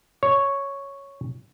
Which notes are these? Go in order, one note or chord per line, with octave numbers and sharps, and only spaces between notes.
C#5